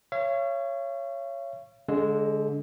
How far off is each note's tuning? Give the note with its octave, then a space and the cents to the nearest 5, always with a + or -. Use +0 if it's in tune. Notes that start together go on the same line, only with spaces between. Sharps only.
C#5 +0 F5 -45
D3 -35 G#3 +0 E6 -10